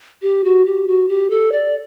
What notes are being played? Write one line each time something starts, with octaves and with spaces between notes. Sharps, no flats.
G4
F#4
G4
F#4
G4
A4
D5